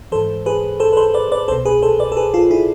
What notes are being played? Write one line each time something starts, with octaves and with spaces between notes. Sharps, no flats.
G#2 E3 A4 C5
G#4 B4
A4 C5
B4
A4 C5
B4 D5
B4 D5
C2 B2 A4 C5
G#4 B4
A4 C5
B4 D5
A4
G#4 B4
F4 A4
E4 G#4